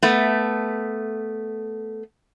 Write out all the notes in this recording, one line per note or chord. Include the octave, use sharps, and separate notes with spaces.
A3 B3